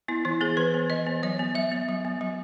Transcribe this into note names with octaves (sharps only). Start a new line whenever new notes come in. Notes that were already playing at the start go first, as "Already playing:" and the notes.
B3 E4
E3 E4
B3 G#4
E3 B4
B3
E3 D#5
B3
F#3 C#5
B3
F#3 E5
B3
F#3
B3
F#3